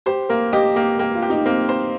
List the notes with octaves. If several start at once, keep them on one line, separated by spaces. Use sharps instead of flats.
G4 C5
A#3 A#4
G4 D#5
A#3 G5
A#3 G5
F4
G4
D#4
A#3 C4
C5